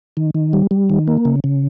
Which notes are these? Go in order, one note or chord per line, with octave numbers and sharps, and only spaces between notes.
D#3
D#3
G3
G3
D#3
A#3
C#3
C#3